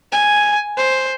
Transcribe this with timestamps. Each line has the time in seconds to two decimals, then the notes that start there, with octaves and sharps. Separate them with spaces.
0.12 G#5
0.77 C5